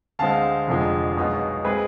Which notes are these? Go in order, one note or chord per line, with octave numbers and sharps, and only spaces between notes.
D2 D3 G#3 C4 F5 A5
F1 F2 D3 F3 G#3
B1 B2 G#3 B3
G#3 C4 G#4 B4